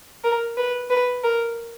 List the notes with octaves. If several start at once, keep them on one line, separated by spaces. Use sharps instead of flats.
A#4
B4
B4
A#4